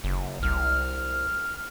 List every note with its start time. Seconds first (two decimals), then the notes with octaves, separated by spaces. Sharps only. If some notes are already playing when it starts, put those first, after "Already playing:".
0.04 F#1
0.43 C2 F6